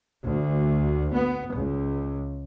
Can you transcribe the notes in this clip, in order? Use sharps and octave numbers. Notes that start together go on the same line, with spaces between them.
D2
B3
C#2